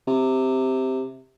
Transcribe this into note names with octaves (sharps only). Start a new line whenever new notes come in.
C3